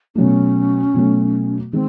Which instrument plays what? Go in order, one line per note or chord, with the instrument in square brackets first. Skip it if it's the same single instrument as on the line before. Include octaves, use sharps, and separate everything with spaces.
[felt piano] B2 F#3 A3 [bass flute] C#4
[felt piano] B2 F#3 A3
[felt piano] D#3 G#3 [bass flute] C4